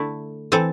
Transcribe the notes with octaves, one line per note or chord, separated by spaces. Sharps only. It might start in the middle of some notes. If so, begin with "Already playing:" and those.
Already playing: D3 A3 E4
E3 C4 A4